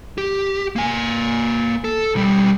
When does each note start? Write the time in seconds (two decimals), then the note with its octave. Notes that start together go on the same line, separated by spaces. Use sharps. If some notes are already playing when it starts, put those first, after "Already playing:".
0.18 G4
0.76 A#3 G#5
1.84 A4
2.15 B1 G3